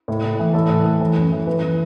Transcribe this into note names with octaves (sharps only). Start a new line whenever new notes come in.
A2
A2
E3
A2 A4
A2
A2
E3
F#2
E3
E3 B4
E3